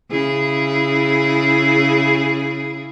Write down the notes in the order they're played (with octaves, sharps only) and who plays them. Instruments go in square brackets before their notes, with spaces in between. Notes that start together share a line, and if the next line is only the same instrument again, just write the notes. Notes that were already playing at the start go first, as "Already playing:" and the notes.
[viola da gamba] C#3 E4 G#4